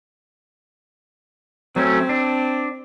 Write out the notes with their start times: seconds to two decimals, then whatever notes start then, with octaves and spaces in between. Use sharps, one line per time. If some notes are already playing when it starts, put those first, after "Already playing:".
1.76 F#3 A3 C4 C#4
2.09 D4